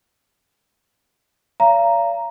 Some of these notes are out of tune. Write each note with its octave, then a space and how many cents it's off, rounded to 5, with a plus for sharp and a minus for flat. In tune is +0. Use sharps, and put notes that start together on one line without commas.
D5 -45 F5 -35 A#5 +0